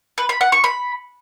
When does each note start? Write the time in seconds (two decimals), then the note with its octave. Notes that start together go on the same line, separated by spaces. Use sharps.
0.18 B4
0.29 B5
0.41 F#5
0.52 C#6
0.64 B5